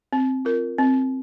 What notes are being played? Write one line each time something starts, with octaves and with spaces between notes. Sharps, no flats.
C4
F4 A#4
C4